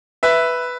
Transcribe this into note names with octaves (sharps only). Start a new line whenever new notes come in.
B4 E5